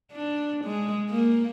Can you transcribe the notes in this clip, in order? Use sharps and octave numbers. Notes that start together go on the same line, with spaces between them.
D4
G#3
A#3